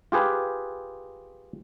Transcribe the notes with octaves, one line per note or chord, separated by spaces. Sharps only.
F4 G4 G#4 B4